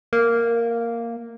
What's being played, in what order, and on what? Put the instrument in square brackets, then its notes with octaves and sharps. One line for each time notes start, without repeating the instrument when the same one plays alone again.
[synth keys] A#3